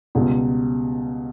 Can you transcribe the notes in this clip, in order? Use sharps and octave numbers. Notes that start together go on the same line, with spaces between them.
C#2 B2 G3